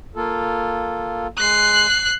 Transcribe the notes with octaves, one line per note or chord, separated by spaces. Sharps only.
A#3 F4 A4
G#3 F#6 C7